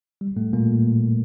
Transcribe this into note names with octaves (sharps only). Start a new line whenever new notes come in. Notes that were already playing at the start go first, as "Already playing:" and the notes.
G3
A2 A3
A#2 A#3